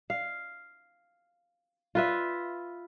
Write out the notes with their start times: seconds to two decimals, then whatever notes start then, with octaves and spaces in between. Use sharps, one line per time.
0.10 F5
1.95 F4 B4 E5